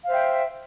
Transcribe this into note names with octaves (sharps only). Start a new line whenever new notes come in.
C5 E5 F5 G5